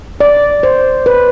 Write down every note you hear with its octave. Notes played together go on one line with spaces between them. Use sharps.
D5
C5
B4